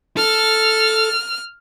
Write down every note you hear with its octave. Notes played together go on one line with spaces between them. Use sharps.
A4 F6